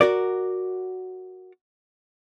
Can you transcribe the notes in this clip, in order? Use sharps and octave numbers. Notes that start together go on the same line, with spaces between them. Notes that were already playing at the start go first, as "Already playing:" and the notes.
F#4 A#4 D5